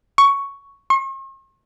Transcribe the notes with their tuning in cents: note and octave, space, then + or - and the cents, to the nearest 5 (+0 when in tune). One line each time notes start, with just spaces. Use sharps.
C#6 +5
C#6 -45